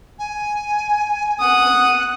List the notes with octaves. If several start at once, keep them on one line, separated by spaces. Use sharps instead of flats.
G#5
F#5 D#6